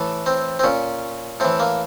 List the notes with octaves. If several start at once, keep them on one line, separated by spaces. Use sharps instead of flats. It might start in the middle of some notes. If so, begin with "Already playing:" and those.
Already playing: A2 E3
C4
C4
A#2 C#4
A2 E3 C4
A#3